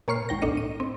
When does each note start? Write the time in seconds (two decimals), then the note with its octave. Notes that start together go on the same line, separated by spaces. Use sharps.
0.08 A#2 A#3 C#5 C#6 F6 C7
0.29 G#1 D#2 G5 A#6
0.42 B1 A2 D4 D#5 C#7
0.57 D#7
0.80 C4